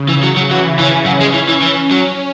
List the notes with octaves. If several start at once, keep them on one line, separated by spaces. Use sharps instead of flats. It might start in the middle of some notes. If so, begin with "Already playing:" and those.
Already playing: C#3
E3
F#3
F#3
E3 F#3
E3 C#4
F#3
G#3
E3
E3
E3 C#4
F#3